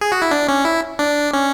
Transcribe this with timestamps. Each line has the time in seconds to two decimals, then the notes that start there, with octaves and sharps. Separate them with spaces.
0.01 G#4
0.12 F#4
0.22 E4
0.31 D4
0.49 C#4
0.65 E4
0.99 D4
1.33 C#4